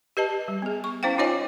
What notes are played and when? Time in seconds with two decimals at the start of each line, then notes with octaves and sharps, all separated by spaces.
0.17 G4 B4 D#5 A5
0.48 G3
0.62 B3 G#4
0.84 C#6
1.03 C#4 E4 C5 F5 G5
1.18 D#4 F4 C5 C#5 D#5 G#5